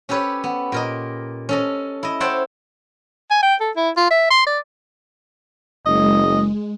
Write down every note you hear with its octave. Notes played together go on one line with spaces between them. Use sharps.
C#4 G4 A4 B4 C#5
B3
A#2 A#4 D#5
C#4 A4 D#5
E4 D#5
C5 C#5 E5 F#5 G5 A5
G#5
G5
A4
E4
F4
E5
C6
D5
F#1 G#3 D#5